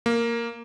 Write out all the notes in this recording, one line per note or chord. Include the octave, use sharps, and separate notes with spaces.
A#3